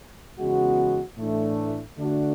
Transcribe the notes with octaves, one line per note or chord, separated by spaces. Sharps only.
E2 C#3 G#3 B3 F#4
A2 E3 A3 D4
D3 A3 D4 F#4